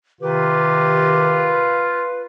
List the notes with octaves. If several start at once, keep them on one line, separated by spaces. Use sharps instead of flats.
C3 D#3 F4 G4 B4